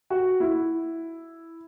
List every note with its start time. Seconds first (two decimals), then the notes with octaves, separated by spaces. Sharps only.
0.10 F#4
0.40 E4